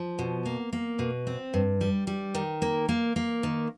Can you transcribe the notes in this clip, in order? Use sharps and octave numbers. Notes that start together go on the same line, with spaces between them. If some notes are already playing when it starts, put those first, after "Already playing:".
Already playing: F3
B2
A#3
A#3
B2
C4
G2
G3
G3
D#3
A#3
A#3
A#3
D#3